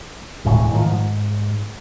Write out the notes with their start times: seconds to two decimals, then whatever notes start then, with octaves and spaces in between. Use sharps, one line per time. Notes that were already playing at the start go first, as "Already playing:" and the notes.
0.45 E1 D2 A2 G#3
0.71 A2 D#3 F3
0.86 G#2